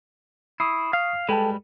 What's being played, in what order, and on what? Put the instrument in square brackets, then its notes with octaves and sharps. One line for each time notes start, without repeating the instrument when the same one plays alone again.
[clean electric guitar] E4 [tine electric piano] C#6 D#6 C7
[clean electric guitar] F5
[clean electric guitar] G3 G#3 B4 [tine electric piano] A4 G5 A5